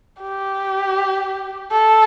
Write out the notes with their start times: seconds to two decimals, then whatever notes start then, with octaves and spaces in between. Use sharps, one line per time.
0.22 G4
1.72 A4